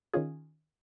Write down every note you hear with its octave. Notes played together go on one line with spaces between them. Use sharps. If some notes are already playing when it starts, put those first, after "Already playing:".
D#3 C#4 F4 G#4